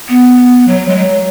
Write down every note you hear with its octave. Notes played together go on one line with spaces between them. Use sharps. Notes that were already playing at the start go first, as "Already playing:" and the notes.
B3
F#3
G#3
F#3